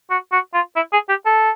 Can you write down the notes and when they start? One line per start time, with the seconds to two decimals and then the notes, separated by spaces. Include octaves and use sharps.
0.11 F#4
0.32 F#4
0.54 F4
0.76 E4
0.93 G#4
1.09 G4
1.26 A4